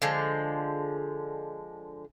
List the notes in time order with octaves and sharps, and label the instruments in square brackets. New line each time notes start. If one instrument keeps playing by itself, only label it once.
[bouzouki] D3 F3 G#3